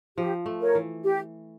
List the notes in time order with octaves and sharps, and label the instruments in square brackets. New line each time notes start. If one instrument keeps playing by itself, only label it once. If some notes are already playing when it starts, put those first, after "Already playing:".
[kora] F3 [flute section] G4
[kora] A3
[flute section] A#4 C#5
[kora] E3
[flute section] G4